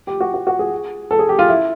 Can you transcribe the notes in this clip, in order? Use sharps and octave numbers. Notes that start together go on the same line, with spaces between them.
G4
F#4
F#4
F#4
G#4
A4
G#4
G4
F4
E4